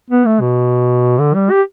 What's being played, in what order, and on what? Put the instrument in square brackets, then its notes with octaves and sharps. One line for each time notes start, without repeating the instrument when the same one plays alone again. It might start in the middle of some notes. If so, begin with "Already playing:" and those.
[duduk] B3
A3
B2
D3
G3
G4